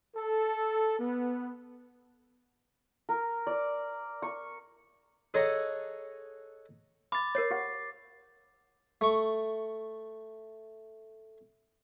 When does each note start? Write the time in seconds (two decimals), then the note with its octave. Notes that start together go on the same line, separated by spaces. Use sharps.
0.17 A4
1.00 B3
3.09 A#4
3.47 D5
4.22 C#6
5.34 G#4 A4 C#5 D#5 F#5 A#5
7.12 B5 D6 A6
7.35 A#4 C#5 A6 C7
7.51 G4 F#5
9.01 A3 C#6